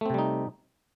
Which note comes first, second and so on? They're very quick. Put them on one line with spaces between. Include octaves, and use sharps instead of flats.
A3 C4 C3 G3 D#4